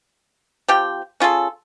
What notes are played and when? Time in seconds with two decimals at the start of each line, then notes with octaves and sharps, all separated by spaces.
0.68 F3 C4 G4 G5
1.20 C#4 F4 G#4 A4